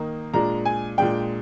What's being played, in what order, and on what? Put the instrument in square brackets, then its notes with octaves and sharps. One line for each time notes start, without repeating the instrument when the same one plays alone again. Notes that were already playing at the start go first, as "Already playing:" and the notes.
Already playing: [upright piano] D#3 A#3 D#4
A#2 G#3 D4 A#5
G#5
A#2 G#3 D4 G5